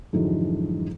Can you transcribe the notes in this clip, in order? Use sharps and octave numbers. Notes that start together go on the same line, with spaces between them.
F2 G#2 D3 E3 F#3 G#3